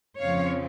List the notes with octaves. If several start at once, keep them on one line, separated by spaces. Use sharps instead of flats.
F2 C#3 F3 C4 C#5 F5